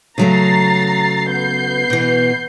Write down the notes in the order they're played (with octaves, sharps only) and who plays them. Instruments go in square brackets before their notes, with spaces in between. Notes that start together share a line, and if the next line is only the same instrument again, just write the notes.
[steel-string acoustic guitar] C#3 F#3 A3 [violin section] A#5 A6 C7
[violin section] B3 G6 C7
[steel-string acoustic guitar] B2 E3